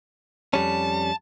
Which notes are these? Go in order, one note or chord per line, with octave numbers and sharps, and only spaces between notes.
F2 G3 C#4 A5